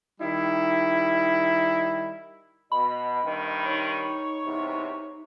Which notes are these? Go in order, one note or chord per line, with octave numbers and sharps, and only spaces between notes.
D#3 G3 D#4 E4
B2 D#5 B5
G2 C3 D#3
D#4 C#5
E2 C3